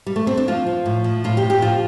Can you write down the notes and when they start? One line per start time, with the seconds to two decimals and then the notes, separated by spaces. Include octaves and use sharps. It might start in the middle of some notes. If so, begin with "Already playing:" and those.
0.06 G3
0.16 A3
0.27 C4
0.37 D4
0.48 F3 F4
0.67 F3
0.86 A2
1.04 F3
1.24 A2 F4
1.37 G4
1.42 A2
1.50 G4
1.62 F3 F4